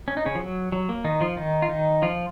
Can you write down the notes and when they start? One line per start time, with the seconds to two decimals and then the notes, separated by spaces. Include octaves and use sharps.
0.08 C#4
0.17 D#4
0.26 C#3 C#4
0.35 F3
0.39 F#3
0.72 F#3
0.89 A#3
1.04 D#3 D#4
1.21 F3 F4
1.37 D#3 D#4
1.62 F4
1.69 D#3 D#4
2.02 F3 F4